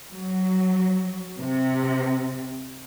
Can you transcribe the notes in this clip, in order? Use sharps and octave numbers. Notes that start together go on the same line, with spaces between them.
F#3
C3